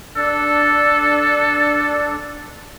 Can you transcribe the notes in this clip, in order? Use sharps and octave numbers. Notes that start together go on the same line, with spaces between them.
D4 A4